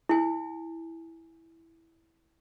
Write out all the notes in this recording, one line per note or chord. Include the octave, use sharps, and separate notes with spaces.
E4 G#5